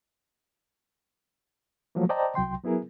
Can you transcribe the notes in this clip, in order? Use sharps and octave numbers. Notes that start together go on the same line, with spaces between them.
F3 F#3 A3 A#3
C5 D5 D#5 G5 A5 A#5
C2 F#3 G5 C6
F#3 B3 E4 G#4 A#4